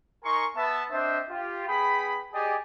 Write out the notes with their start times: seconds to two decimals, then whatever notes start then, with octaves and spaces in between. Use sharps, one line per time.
0.24 D#4 A#4 G#5 C6 C#6
0.56 B3 E5 A5
0.91 C4 D4 C5 D#5 E5
1.30 F4 G4
1.68 B3 G#4 G5 B5
2.33 G4 G#4 D5 D#5 G5 G#5